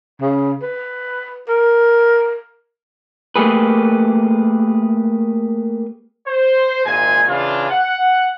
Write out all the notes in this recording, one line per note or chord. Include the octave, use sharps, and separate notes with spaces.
C#3
B4
A#4
A3 A#3 G4 G#4 B4
C5
G#1 A#2 G#3 G#5
C#3 E3 D4 F4
F#5